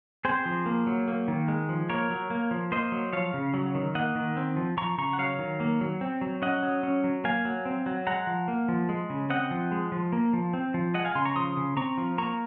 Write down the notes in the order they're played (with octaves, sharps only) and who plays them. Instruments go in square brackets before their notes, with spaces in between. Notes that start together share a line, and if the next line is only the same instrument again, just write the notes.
[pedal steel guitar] C4 G#4 C5
F3
A#3
F#3
A#3
D#3
G#3
F3
A#3 A#4 C#5
F#3
A#3
F3
A#3 C5 D#5
F#3
F3 C#5 F5
C#3
F#3
D#3
A#3 D#5 F#5
D#3
C4
F3
F3 A#5 C#6
C#3 A#5 C#6
F#5
F#3 C#5 F5
D#3
A#3
F#3
C4
F#3
C#4 D#5 F#5
F#3
C#4
F#3
A#3 F5 G#5
F#3
C4
F#3
G#3 F#5 A#5
F3
A#3
F3
G#3
C#3
C4 D#5 F#5
F3
G#3
F3
A#3
F3
C4
F3
G#3 D#5 F#5
F5 G#5
C#3 G#5 C6
A#5 C#6
F3 C6 D#6
C#3
C4 A#5 C#6
F3
A#3 A#5 C#6